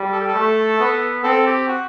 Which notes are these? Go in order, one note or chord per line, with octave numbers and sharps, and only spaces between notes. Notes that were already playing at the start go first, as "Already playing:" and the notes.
Already playing: G3
A4
G4
A4
A3
B3
C4 A4
G4
F#4